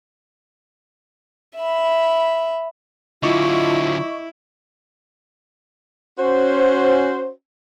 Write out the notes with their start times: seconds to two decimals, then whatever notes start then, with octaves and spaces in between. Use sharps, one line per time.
1.56 E5 B5
3.23 D3 F#3 E4 F4 D#5 C#6 D6
6.19 C#4 F#4 C5